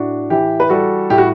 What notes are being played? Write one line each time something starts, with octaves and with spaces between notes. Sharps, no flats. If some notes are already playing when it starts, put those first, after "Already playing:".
Already playing: A2 D4 F#4
E3 E4 G4
B4
G3 F#4 A4
A2 G4
F#4